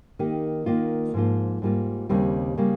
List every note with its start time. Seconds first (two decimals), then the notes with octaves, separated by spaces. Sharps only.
0.19 D#3 A#3 D#4 G4
0.66 D#3 A#3 F4
1.14 G#2 F3 A#3 F4
1.62 G#2 G3 A#3 F4
2.09 D#2 C#3 G3 C4
2.57 C#3 G3 A#3